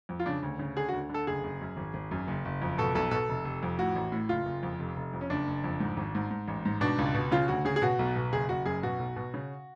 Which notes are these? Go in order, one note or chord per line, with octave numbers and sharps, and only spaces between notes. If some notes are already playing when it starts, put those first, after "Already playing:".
F2
F4
C#3 D4
D2
C#3
D3 G#4
F#4
D2
D3 A4
F#1 G#4
F#1
F#2
G#1
G#1
F#2
F#1
F#1
F2
B2 A4
B1 A4
B2 A4
F1
F1
F2
A2 F#4
A1
A2
F#1 F4
F#1
F2
F1
F1
F2
C#4
F#1 D4
F#1
F2
G#2
G#1
G#2
G#2
A1
G#2
B2 D4
C#2
B2
C#3 F4
D2 F#4
C#3 G#4
G#4
B2 F#4
B1
B2
F#1 G#4
F#1 F#4
F#2 G#4
B2 F#4
B1
B2
C#3